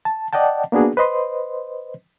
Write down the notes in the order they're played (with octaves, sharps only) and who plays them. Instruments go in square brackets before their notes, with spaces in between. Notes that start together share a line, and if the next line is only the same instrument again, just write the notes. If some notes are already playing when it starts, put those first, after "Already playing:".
[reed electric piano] A5
D5 D#5 F#5 G5 A5
A#3 B3 D4 F#4 G#4
B4 C5 D#5 C6